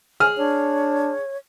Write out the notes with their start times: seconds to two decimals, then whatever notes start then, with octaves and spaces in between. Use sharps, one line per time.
0.20 G#4 F6
0.37 D4 C#5